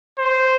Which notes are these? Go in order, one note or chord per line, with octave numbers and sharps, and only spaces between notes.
C5